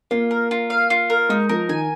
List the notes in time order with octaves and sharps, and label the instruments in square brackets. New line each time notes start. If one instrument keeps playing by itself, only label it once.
[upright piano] A#3 [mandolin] F4
[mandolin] A#4
F4
F5
F4
A#4
[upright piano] G#3 [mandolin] D#4
[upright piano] F3 [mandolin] A#4
[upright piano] D#3 [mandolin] G#5